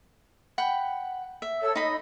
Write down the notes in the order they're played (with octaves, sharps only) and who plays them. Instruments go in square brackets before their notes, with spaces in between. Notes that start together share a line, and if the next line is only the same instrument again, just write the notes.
[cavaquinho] F#5 G5 B5
E5
[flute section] A4 C#5 E6
[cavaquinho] D#4 B5 [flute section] D#5